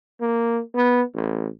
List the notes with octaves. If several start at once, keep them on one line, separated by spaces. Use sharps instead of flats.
A#3
B3
A1